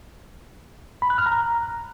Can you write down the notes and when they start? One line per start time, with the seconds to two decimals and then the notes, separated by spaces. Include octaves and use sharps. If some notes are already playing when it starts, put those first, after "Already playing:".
1.02 B5
1.10 F#6
1.18 F6
1.26 A#5